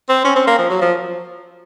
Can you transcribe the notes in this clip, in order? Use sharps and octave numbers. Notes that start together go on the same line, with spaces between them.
C4
C#4
C4
A#3
F3
F#3
F3